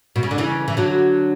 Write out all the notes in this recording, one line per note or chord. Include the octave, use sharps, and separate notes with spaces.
B2
C#3
D3
C#3 E3
E3
D3 F#3